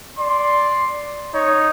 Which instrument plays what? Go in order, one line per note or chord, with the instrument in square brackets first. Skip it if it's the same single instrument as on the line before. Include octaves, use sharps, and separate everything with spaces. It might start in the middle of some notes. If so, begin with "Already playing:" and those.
[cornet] D5 [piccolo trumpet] C6
[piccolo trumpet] D#4 [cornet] C#5